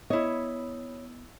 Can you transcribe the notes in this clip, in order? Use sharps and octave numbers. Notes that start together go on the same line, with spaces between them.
B3 E4 C#5 D#5